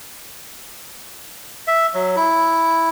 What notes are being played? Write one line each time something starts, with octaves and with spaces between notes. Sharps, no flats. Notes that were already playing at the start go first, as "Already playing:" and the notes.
E5
F#3
E4